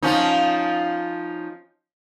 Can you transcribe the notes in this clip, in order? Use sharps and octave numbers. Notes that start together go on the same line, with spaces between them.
F3 C#4 D#4